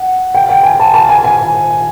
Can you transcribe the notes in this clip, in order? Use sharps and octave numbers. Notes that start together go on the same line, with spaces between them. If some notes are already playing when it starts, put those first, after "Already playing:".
Already playing: F#5
G5
G5
G#5
A5
A5
G#5
G#5